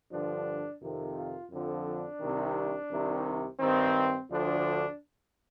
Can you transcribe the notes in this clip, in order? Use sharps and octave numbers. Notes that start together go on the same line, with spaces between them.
G2 D3 F3 D4
F2 C3 D#3
F4
F2 D3 F3
D4
C2 C3 D#3
C2 C3 D#3
G2 D#3 C4
D2 D3 F3 D4